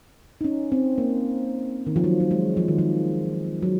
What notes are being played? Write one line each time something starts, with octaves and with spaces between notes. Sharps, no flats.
D#4
C#4
C4
A#3
D#3
F3
F#3
F#3
G#3
F3
D#3
F3
F#3